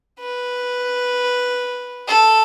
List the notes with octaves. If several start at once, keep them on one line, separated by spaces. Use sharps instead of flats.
B4
A4